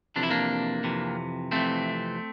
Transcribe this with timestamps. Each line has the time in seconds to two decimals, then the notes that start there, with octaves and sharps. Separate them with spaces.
0.16 F2 C3 E3 D4
0.23 E4
0.31 A#3 D4
0.84 F2 C3 E3
1.51 F2 C3 E3 A3 C4